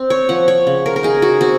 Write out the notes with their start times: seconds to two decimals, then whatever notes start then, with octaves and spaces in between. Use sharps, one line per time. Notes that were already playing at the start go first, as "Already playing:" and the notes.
Already playing: C4
0.10 C#5
0.29 F3 F#5
0.48 C#5
0.67 C#3
0.86 A#4
0.96 A#4
1.03 D#4 G#4
1.22 F#4
1.41 C4 F#4